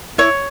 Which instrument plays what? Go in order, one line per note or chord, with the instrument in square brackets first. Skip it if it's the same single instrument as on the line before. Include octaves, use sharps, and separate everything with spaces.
[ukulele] E4 C#5